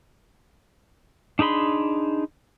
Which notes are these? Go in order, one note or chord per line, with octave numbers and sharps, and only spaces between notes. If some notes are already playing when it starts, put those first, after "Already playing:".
D4 D#4 G#4 B5 C6